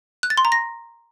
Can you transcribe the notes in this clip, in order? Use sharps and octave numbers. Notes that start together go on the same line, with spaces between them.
F#6
A6
C6
A#5
A#6